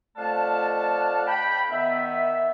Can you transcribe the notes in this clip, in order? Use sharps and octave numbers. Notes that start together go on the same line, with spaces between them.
F2 A3 D5 F5 F#5 A5
G5 B5
D#3 B3 E5